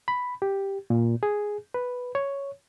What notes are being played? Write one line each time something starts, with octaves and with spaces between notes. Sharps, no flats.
B5
G4
A#2
G#4
B4
C#5